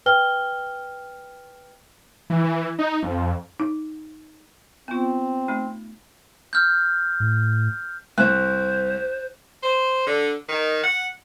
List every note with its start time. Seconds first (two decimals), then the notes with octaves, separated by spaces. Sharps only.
0.06 B4 G5 F6 G7
2.30 E3
2.44 E3
2.79 D#4
3.03 F2
3.60 D#4
4.88 B3 C4 F4
5.48 A3 D#4
6.53 F6 G6
7.20 A2
8.18 C2 C5 F#6
9.63 C5
10.07 D3
10.49 D#3
10.83 F#5